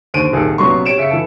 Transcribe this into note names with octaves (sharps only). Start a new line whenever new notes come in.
D#2 D3 C5 D7 D#7
D#1 C2 D#3 G#4 A4
A#1 C3 F#3 B3 C6 C#6
G4 C#5 D7 E7
C#3 E5 F5 C#7
E3 A4